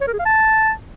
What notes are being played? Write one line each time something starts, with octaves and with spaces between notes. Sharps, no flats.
C#5
A#4
G#4
F5
A5